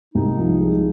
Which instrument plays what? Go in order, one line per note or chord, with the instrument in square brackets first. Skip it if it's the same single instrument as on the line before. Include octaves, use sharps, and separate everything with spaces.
[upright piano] C2 [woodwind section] D#4
[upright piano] F3
G#3